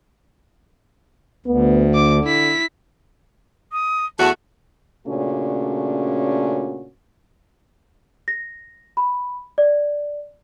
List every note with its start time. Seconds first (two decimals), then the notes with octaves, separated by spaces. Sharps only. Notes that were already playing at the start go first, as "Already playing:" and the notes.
1.46 D2 B3
1.95 D3 D6
2.24 E4 B6
3.72 D#6
4.19 E2 A3 F#4 A5
5.07 A#2 C#3 A3 C#4 D4 F#4
8.28 A#6
8.97 B5
9.58 D5